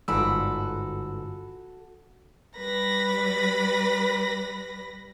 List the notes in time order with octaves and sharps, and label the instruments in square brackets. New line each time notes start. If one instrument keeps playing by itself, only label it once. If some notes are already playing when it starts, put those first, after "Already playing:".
[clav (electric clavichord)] G1 G#2 D5 [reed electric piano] F4 B5 E6 [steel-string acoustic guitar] F#4 A4
[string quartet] G3 B4 B5 A#6